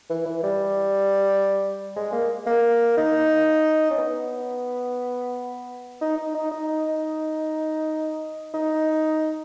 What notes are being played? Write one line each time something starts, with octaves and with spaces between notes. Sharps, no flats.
E3
E3
G3
G#3
A#3
A#3
D#4
C#4
B3
D#4
D#4
D#4
D#4
D#4